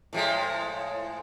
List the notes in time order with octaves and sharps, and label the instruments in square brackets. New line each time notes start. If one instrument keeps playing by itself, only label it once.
[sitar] A2 F3 G#3